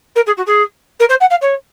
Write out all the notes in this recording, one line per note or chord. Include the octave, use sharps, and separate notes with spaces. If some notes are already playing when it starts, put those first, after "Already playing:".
A#4
G#4
F#4
G#4
A#4
C5
F#5
F5
C#5